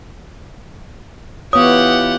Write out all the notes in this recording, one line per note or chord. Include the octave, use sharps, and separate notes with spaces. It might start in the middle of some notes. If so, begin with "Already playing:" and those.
E3 B3 F4 G4 B4 C#5 F#5 D#6